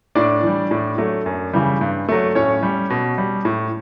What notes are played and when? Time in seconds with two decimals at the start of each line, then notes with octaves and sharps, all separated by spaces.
0.15 A2 D4 D5
0.43 E3 G3
0.71 A2
0.98 F#3 A3
1.26 F#2
1.53 C#3 E3 G3
1.81 G2
2.09 F#3 A3
2.35 A2 C#4 C#5
2.63 G3
2.90 B2
3.18 G3
3.45 A2